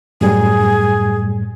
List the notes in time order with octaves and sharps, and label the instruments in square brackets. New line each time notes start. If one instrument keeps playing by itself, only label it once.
[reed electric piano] F#2 A2 G3 [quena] G#4